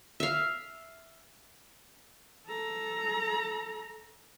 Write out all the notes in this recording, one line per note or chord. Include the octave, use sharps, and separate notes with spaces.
E5 F5
A4 A#5